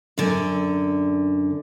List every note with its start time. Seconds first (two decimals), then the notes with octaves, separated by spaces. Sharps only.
0.18 F#2 D3